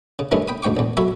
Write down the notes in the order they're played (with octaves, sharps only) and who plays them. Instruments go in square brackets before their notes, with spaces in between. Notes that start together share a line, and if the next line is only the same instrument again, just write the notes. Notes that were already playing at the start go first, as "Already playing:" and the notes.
[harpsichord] C#3
G2 D#3 E3 A3 C#4 E4
G5 B5 D#6
D2 G#2 G5 C#6 D6
A#1 E2
F#3 A4 C#5 E5 B5